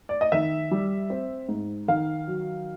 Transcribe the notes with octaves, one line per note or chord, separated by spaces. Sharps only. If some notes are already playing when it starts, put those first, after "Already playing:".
D5
D#5
D#3 E5
G3
C4
G#2
D#3 F5
F#3